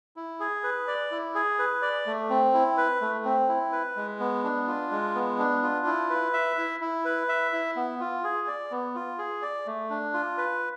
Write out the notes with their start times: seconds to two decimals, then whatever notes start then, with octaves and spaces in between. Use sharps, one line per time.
0.16 E4
0.40 G#4
0.64 B4
0.87 D5
1.11 E4
1.35 G#4
1.59 B4
1.82 D5
2.06 A3
2.30 C4
2.54 E4
2.78 B4
3.01 A3
3.25 C4
3.49 E4
3.72 B4
3.96 G#3
4.20 B3
4.44 D4
4.67 F4
4.91 G#3
5.15 B3
5.39 D4
5.62 F4
5.86 E4
6.10 B4
6.33 E5
6.58 E4
6.81 E4
7.05 B4
7.29 E5
7.53 E4
7.76 B3
8.00 F4
8.24 G#4
8.47 D5
8.71 B3
8.95 F4
9.18 G#4
9.42 D5
9.67 A3
9.90 D4
10.14 F4
10.38 B4